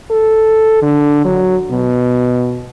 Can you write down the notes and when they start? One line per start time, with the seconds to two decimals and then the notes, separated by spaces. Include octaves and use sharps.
0.10 A4
0.82 D3
1.25 F#3
1.71 B2